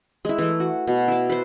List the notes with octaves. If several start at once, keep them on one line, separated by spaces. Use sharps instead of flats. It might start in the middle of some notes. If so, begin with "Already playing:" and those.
G#3 E4
E3 A3
F#4
B2
E4 D6
B4 C5